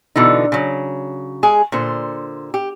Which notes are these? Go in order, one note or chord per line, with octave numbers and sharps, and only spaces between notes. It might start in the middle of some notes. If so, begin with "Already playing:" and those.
B2 D3 E3 D#4
C#3 F#3
G#3 G#4
A#2 D3 C5
G4